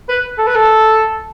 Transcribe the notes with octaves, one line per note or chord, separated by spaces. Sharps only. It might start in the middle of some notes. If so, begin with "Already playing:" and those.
B4
A4
B4
A4